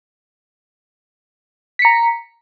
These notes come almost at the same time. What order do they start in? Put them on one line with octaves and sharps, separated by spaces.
B6 C#7 A#5